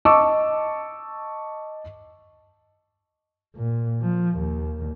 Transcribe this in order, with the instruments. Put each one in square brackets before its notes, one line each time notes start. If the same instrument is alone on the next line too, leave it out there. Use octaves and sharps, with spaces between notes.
[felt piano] D#5 A5 C#6 D6 E6
[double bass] A#2
F3
D#2